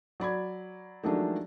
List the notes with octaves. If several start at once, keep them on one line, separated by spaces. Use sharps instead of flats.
F#3 D5 B5 G#6
D#3 F3 F#3 G#3 A3 D4